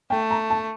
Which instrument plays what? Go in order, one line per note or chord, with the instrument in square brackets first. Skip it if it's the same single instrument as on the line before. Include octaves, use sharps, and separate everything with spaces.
[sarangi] A3 [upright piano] G5
[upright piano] A#5
A5